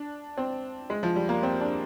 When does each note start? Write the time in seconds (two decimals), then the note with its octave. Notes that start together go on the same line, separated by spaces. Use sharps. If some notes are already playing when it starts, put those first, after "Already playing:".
Already playing: D4
0.37 C4
0.90 G#3
1.03 F3
1.16 G3
1.29 A#3
1.43 C4
1.61 D4